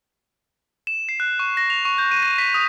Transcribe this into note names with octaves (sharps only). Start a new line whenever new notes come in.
E7
C7
F#6
C#6
A#6
F7
C#6
G6
D#7
A#6
B6
D#6